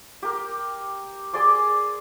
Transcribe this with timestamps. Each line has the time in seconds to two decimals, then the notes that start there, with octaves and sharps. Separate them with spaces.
0.22 G4 A#4
1.33 G#4 D5 C6 D6